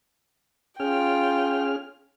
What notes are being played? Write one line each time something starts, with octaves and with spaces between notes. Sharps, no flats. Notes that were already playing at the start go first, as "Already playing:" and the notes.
C#4 F4 G#4 G5 F6